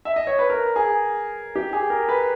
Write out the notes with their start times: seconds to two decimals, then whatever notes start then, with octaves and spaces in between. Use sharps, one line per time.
0.05 E5
0.16 D#5
0.27 C#5
0.39 B4
0.50 A#4
0.76 G#4
1.56 G4
1.73 G#4
1.90 A#4
2.09 B4